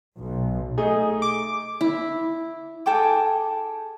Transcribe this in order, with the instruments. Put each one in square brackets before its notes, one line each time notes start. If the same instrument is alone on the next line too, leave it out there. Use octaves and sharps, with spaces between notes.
[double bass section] B1
[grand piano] A3 D#4 [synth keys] G#4
[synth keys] D6
[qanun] E4
[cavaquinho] G#4 A4 G5 D6